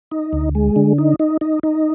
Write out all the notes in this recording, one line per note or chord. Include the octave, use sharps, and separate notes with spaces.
D#4
D2
G#3
D3
D#4
D#4
D#4
D#4